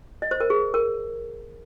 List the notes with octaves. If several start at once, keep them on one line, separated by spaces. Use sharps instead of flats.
D#5
C5
A#4
G#4
A#4